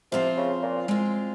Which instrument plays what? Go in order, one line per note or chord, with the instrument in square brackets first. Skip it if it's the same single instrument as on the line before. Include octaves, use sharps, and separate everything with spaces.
[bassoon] C3 [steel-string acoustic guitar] F3 C4 F4
[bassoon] C#3
A#2
[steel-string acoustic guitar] G#3 C4 F4